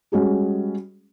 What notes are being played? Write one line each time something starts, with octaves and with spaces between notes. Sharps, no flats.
G3 G#3 C#4 F#4 G#4